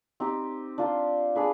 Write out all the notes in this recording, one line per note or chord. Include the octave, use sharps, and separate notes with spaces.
C4 D#4 G4
D4 F4 C5
D4 G#4 B4